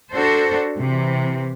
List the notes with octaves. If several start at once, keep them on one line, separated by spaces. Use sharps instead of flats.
D4 F#4 A4 C5
C3 E3